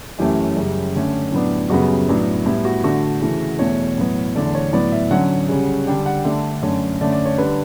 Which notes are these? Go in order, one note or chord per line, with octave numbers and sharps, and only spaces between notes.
F#2 E3 A3 C#4 G4
F#2 C#3 G3
D3 A3 C#4
A2 F#3 B3 D4
F#2 C#3 G3 B3 F#4
A2 F#3 B3 D4
A2 G3 B3 E4
F#4
D3 A3 D4 F#4
C#3 E3 A3
E2 B2 A3 C#5
A2 F#3 B3
E2 D3 A3 D5
C#5
A2 F#3 B3 D5
E5
D3 F#3 C#4 F#5
C#3 G3 C#4
D3 G3 D4 G5
F#5
D3 A3 D4 E5
F#2 D3 A3 C#4
D3 A3 C#4 D5
D5
C#5
D3 G3 D4 B4